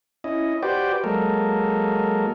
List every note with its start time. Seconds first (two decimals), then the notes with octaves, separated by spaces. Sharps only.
0.24 C#4 E4 D#5
0.63 F#4 G4 B4 C5 D5 G5
1.04 F#3 G#3 A#3 A4 A#4